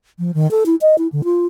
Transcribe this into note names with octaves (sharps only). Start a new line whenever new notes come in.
F3
D#3
A4
E4
D#5
E4
D3
F4